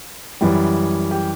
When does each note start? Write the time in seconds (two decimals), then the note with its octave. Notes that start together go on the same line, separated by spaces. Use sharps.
0.41 F#2 E3 G3
1.11 G4